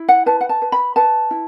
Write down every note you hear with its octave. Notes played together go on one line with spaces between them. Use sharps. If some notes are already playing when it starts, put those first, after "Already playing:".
Already playing: E4
F#5
B4 A5
F#5
A5
B4
B5
B4 A5
E4